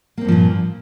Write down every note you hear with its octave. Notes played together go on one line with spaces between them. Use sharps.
G2 A#2 F3 A#3 C4